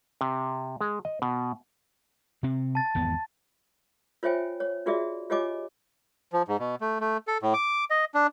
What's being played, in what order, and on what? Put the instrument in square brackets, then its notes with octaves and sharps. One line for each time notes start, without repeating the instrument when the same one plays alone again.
[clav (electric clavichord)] C3
G#3
D#5
B2
[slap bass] C3 C4
[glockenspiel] A5 A6
[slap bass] G#1 E2 B3
[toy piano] F4 C5 C#5 E5 G5 G#5
C#5
D4 F4 F#4 G#4 D5 E5
F4 G4 C#5 D#5 G#5 D6
[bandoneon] F3
G#2
B2
A3
A3
A4
A2
D6
D#5
D4